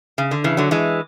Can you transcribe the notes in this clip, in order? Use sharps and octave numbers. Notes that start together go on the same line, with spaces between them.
C#3
D3
C#3 E3
D3 F#3
E3 G#3